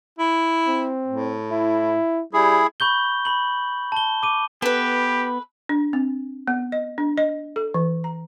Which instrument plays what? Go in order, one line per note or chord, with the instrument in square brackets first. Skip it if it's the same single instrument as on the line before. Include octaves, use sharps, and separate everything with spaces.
[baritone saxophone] E4
[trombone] C4
[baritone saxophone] A2
[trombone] E4
[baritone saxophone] G3 [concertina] E4 G#4
[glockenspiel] B5 C#6 G6 G7
B5 F#7
A5 G7
D6 D#7
[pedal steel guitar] B3 [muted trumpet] G4 [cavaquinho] A4 B4
[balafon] D4
C4
B3
D#5
D4
D#5
A4
E3
A#5